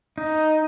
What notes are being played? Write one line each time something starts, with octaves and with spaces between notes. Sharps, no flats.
D#4